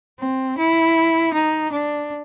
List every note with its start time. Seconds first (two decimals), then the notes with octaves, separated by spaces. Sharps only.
0.20 C4
0.58 E4
1.33 D#4
1.72 D4